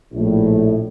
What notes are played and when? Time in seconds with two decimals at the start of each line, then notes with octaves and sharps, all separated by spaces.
0.12 A#1 A2